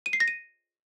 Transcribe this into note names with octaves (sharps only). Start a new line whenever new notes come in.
D#7
C7
A#6
D#7